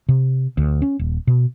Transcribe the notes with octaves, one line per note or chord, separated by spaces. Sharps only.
C3
D2
C#4
D#1
B2